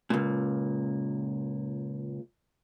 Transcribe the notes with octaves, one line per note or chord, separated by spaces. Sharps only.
C#2 A#2